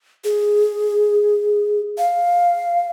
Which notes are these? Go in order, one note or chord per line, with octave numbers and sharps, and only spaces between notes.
G#4
F5